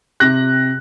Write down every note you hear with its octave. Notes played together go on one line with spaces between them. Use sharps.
C3 F#6 A#6